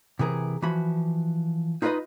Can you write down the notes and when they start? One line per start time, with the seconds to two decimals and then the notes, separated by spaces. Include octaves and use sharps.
0.19 C3 E3 G#4 A#4
0.62 E3 F3 F#4 B5
1.82 D#4 F4 B4 D5 D#5 B5